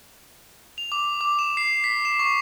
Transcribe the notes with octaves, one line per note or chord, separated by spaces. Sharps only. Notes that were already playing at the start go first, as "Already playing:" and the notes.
F7
D6
D6
E7
C7
B6
E7
C#6